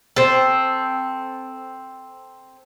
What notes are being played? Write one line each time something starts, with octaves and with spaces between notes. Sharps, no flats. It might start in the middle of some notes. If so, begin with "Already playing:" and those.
C4 A4